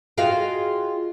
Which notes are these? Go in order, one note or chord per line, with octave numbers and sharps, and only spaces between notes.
F4 F#4 G#4 D#5 F5 G5